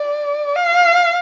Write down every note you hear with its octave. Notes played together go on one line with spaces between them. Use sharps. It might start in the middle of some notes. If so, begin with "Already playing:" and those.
Already playing: D5
F5